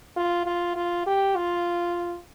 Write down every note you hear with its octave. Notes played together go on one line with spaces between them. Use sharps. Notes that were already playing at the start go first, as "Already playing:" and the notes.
F4
F4
F4
G4
F4